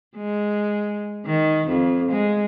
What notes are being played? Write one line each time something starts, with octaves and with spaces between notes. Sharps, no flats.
G#3
D#3
F2
G#3